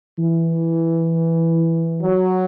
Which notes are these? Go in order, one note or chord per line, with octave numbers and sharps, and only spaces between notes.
E3
F#3